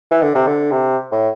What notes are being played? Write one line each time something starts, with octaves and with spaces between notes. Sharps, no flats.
E3
D3
C3
D3
C3
A2